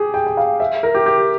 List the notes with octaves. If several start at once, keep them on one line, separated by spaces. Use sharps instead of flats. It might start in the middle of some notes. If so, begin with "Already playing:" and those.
Already playing: G4 G#4
G5
G5
F5
E5
A#4
G4
G4